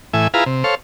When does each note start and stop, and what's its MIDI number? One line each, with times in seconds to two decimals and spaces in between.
0.14 0.28 45
0.14 0.28 52
0.14 0.28 76
0.14 0.28 80
0.34 0.44 64
0.34 0.44 65
0.34 0.44 68
0.34 0.44 71
0.34 0.44 77
0.34 0.44 82
0.46 0.63 48
0.64 0.75 69
0.64 0.75 72
0.64 0.75 73
0.64 0.75 77